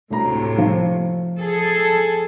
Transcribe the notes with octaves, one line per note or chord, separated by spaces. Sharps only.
D2 A2 C3 A#5
F3
G#4 A4